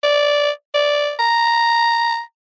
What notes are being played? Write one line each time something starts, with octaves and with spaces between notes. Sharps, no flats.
D5
D5
A#5